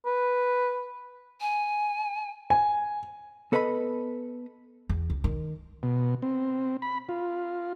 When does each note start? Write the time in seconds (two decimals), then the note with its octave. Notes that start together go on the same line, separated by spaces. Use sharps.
0.06 B4
1.41 G#5
2.50 G#5
3.52 B3 A4 B4 D#5 F5 B5
4.89 E2
5.10 C#2
5.24 D#3
5.83 B2
6.22 C4
6.82 B5
7.09 F4